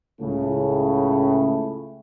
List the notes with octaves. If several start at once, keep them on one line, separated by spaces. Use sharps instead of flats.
C#2 A2 C#3 A3